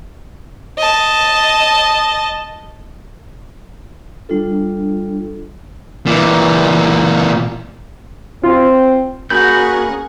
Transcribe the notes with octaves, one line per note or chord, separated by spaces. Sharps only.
D#5 A5
G3 D4 F4 A4
A#2 E3
C4 F4
A#3 C#4 F#4 G#4 A#4 F#5 B5 G6